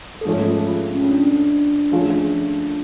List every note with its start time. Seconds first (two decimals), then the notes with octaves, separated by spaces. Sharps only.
0.21 A4
0.25 G#2 F3 A3 C#4 G#4
0.46 F4
0.67 F4
0.88 C#4
1.09 D4
1.92 F3 A3 C#4 F4 G#4